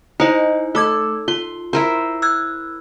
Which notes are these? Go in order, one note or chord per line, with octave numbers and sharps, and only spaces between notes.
D#4 E4 C5 D#5 F#5
A3 A4 D6 G#6
F4 C6
E4 A#4 C5
E6 F#6 G#6